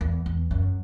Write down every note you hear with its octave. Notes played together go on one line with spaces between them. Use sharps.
E2
E2
F#2